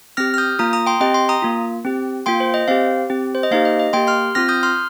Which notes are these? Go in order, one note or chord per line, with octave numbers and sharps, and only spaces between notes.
C4 G4 F6 A#6
F6
D#6 G6
A#3 F4 A#5 D#6
A#5 D#6
G5 C6
C4 G4 D#5 G5
G5 C6
A#5 D#6
A#3 F4
C4 G4
A#3 F4 G5 C6
C5
D#5
C4 G4 C5 F5
C4 G4
C5
D#5
A#3 D#4 G4 C5 F5
D#5
D#5
A#3 G4 G5 C6
C6 F6
C4 F4 F6 A#6
D#6 G6
C6 F6